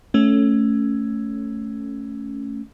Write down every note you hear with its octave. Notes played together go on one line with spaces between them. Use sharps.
A3 C#4